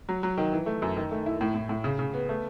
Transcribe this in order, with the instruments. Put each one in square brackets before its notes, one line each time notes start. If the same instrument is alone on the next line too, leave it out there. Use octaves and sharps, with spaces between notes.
[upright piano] F#3
F#3
D#3
E3
A3
F#2
D#3
A3
E4
A2
A2
A2
C#3
C#3
B3
A3